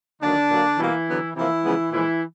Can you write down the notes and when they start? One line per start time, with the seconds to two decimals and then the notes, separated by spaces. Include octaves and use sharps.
0.21 D3 D#3 F#3 A#3 D4
0.50 A#2 F#3 A#3
0.78 B2 E3 G3 A#3 E4
1.07 D3 F#3 B3
1.35 C3 E3 F3 A#3 E4
1.64 C#3 F3 G#3 B3
1.92 A#2 E3 F3 G#3 E4